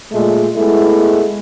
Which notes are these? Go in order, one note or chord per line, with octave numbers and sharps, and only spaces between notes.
A#2 G#3 A3
G#3 A3 B3 E4